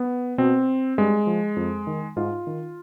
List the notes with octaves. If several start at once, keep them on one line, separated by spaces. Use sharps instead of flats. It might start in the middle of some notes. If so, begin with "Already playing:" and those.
Already playing: B3
B2 C4
G2 G#3
F3
F2
D#3
G#2 F4
D#3